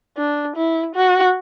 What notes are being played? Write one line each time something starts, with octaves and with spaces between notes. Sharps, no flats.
D4
E4
F#4